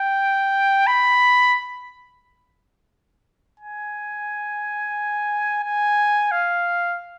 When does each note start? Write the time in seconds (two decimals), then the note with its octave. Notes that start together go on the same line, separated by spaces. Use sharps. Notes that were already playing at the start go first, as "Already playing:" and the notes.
Already playing: G5
0.87 B5
3.60 G#5
5.64 G#5
6.31 F5